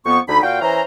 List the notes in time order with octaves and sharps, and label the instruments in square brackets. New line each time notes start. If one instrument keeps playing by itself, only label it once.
[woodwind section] F2 B3 C#6
D2 D3 D#4 B5
A#2 F#4 F5 G5
E3 C#4 C5 A#5